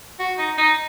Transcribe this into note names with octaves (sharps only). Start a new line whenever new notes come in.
F#4
D#4
D#4